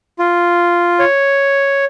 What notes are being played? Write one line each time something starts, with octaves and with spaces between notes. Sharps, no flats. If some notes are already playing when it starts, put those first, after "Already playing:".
F4
C#5